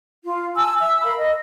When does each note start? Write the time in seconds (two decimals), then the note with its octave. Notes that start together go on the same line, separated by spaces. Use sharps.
0.23 F4
0.56 G#5 A5 E6
0.79 E5 E6
1.03 A#4 F5 B5
1.17 D#5